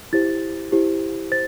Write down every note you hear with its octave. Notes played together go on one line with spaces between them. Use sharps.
E4 G4 C5 A6
E4 G4 C5
C5 A6